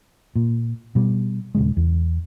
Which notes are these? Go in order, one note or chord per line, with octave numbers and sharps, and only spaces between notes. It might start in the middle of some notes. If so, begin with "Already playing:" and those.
A#2
B2 G3
D#1 C#3 G#3
E2